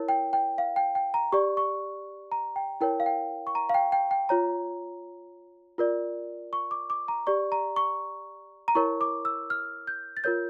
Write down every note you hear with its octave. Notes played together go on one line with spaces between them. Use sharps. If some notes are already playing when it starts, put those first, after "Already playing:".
Already playing: E4 A#4 C#5
G5
G5
F5
G5
G5
A#5
G4 D5 C#6
C#6
A#5
G5
E4 A#4 C#5 G5
F5
G5
C#6
A#5
F5
G5
G5
G5
F4 C#5 A#5
F4 A#4 D5
C#6
D6
D6
A#5
G4 D5 C#6
A#5
C#6
A#5
E4 A#4 C#5 C#6
D6
E6
F6
G6
A6
F4 A#4 C#5 G6